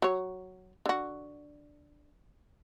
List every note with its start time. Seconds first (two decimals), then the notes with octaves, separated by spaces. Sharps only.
0.02 F#3 C#5
0.86 D3 F#4